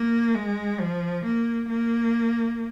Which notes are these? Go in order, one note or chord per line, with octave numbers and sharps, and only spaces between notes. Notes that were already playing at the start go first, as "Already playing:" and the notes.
Already playing: A#3
G#3
F3
A#3
A#3